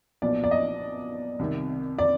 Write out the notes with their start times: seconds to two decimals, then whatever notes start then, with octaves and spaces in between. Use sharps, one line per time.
0.22 B1 A#2 F3 D5
0.44 D5
0.51 D#5
1.39 C2 C3 D#3
1.99 D5